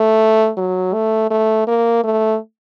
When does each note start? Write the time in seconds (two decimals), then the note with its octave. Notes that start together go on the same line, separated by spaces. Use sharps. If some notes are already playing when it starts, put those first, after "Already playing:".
Already playing: A3
0.57 F#3
0.93 A3
1.31 A3
1.67 A#3
2.04 A3